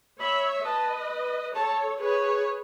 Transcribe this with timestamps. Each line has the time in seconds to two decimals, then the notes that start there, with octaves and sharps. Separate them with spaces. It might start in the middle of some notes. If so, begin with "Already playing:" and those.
0.20 C#5 E5 B5
0.65 B4 D#5 A5
1.56 A4 C#5 A5
2.01 G#4 B4 C#5